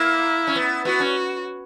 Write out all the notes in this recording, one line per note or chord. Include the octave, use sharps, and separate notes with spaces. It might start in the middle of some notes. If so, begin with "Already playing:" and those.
Already playing: A#3 E4
C#4
B3
B3 F#4
C#4